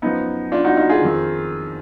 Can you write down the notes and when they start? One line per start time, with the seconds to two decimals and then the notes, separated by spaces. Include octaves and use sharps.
0.02 F#2 F3 B3 D#4
0.52 D4 F4
0.65 D#4 F#4
0.77 D#4 F#4
0.89 F4 G#4
1.02 F2 D#3